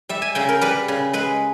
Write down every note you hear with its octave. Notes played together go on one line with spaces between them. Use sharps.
G3 E5
G#5
C#3 G5
A#4
G3 B4
C#3
G#3 B4